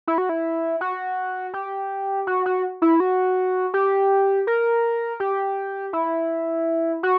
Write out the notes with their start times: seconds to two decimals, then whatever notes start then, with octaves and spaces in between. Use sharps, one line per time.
0.07 E4
0.18 F#4
0.29 E4
0.81 F#4
1.54 G4
2.27 F#4
2.46 F#4
2.82 E4
3.00 F#4
3.74 G4
4.47 A#4
5.20 G4
5.93 E4
7.03 F#4